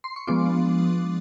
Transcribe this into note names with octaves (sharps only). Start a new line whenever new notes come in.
C6
C#6
F3 G#3 B3 D4 F4 C6 D6